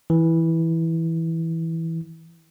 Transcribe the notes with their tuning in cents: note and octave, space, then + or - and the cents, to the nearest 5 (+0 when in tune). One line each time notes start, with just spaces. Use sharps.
E3 -10